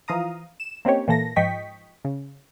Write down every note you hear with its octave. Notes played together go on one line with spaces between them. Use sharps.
E3 F3 F5 A#5 D#6
E7
A#3 C4 C#4 D#4 G4 C#5
A#2 E3 A#3 A4 A#6
G#2 F3 D#5 G5 C#6 B6
C#3